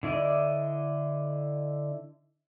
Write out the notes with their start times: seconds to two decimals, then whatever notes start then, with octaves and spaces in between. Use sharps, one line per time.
0.03 D3 E4 D5 D#5